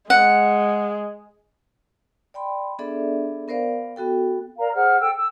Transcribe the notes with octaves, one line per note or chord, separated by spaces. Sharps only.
G#3 F#5
D5 G5 B5 C6
B3 D4 G#4 A4 D5 E5
B3 A#4 C5 D5 F5
B3 F#4 A4 G5
A#4 D5 F5 A#5
G#4 C5 F#5 F6
A4 G5 E6
E6